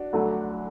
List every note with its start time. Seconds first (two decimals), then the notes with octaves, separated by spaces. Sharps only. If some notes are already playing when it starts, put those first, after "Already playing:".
Already playing: D4 F#4
0.13 D2 D3 F#3 A3